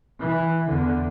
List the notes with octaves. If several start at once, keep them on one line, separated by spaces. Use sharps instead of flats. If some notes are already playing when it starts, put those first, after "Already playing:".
E3
E2 D3